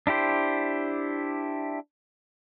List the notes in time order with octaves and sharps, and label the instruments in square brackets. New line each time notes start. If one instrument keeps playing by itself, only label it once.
[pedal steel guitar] D4 E4 G4 C5